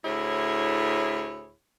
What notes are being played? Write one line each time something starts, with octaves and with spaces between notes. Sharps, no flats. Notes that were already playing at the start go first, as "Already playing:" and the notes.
D2 A2 E4 G#4 C#5